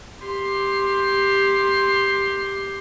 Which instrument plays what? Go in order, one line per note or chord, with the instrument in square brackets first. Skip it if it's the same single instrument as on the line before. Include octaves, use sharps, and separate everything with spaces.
[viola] G4 C6